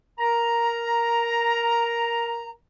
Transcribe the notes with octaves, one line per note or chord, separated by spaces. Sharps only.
A#4 A#5